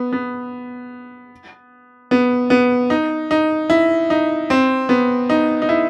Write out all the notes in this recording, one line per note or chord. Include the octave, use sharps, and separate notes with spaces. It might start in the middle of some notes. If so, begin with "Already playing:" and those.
Already playing: B3
B3
B3
B3
D#4
D#4
E4
D#4
C4
B3
D#4
D#4
E4